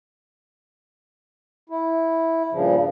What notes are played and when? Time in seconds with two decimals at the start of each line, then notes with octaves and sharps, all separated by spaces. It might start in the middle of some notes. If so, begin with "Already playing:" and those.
1.70 E4
2.52 G2 A#2 C#3 F3